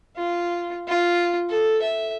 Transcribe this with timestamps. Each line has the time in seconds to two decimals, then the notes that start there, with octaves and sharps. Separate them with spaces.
0.17 F4
0.88 F4
1.49 A4
1.82 E5